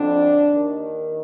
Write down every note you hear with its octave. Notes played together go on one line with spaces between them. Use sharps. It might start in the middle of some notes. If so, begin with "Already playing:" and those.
Already playing: F2 D3 D4
D#2 D#3